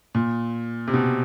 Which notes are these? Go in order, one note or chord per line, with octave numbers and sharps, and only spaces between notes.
A#2
C3
B2